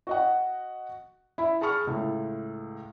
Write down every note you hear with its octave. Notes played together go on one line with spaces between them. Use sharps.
F#4 D#5 F#5
E4 B5
G#4 A5 B5 C#6 F6
C#2 A2